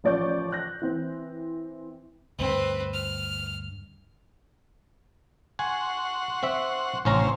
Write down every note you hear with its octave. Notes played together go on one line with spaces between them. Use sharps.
A1 F3 D5 C#6 G6
F#6 G6 A#6
E3 C4
D2 G2 C4 B4
F6
F#5 G#5 C6 C#6
C4 E5
A1 C3 C#4 C5 C#5 A#5